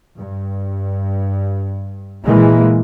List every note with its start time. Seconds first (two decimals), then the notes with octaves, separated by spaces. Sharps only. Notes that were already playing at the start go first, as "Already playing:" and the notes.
0.17 G2
2.26 A#2 E3 G#3 A#3